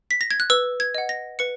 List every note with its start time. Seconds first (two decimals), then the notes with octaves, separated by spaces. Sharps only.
0.11 B6
0.21 A#6
0.31 G#6
0.40 F#6
0.50 B4 E6
0.80 G#6
0.95 D#5 F#5
1.09 A#6
1.39 B4 C#7